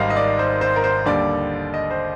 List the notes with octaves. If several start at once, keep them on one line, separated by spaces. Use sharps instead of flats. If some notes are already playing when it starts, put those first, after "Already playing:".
Already playing: G#1 G#2 D#3 G3 D#5 F5
D#5
D5
C5
C5
A#4
C5
D#2 D3 G3 D5
D#5
C5